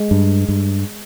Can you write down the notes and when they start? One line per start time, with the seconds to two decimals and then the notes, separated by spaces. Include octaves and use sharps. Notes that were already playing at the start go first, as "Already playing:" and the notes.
Already playing: G#3
0.11 G2
0.49 G2